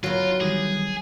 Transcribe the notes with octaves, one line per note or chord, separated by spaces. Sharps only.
F#3 B3 F4 F#4
D#3 E3 G3 G#4